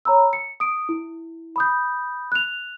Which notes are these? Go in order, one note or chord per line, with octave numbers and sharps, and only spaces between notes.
C#5 A#5 B5 E6
C#7
D#6 D7
E4
B5 D#6 G6
F#6 F7